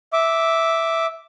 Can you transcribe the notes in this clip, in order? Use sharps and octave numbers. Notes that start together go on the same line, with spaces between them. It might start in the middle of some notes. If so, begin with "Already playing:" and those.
E5 D6